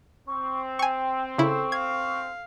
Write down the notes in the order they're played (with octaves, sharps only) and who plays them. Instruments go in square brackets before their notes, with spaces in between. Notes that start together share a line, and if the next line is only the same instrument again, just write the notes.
[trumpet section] C4 [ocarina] C#6
[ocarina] G5 [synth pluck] G#5 C#6
[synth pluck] C#3 E4 [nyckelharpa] A4 [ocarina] C#6
[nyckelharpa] F5 [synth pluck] G#6